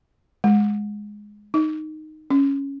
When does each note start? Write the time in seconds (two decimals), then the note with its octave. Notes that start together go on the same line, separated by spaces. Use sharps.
0.44 G#3
1.54 D#4
2.30 C#4